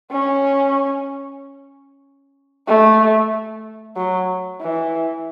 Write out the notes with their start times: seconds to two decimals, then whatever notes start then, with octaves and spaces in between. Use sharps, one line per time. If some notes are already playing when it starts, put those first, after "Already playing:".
0.12 C#4
2.67 A3
3.96 F#3
4.61 E3